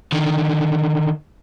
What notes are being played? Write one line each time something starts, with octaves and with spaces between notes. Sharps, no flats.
D3 D#3